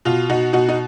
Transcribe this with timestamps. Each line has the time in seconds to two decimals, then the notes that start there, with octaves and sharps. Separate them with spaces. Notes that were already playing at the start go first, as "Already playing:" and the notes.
0.05 B2 F4
0.29 B2 D#4 F#4
0.53 B2 D#4 F#4
0.69 D#4